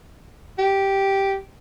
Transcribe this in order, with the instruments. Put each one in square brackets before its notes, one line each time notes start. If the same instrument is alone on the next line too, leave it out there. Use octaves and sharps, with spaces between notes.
[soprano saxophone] G4